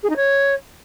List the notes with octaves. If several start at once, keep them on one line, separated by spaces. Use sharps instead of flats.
G#4
D#4
C#5